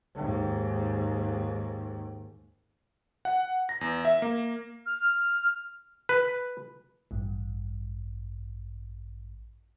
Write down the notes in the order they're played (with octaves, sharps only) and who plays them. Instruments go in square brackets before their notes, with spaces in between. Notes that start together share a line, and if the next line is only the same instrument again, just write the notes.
[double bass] D#2 G#2
[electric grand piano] F#5
A#6
E2
E5
A#3
[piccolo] F6
[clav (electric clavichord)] B4
[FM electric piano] A1 G2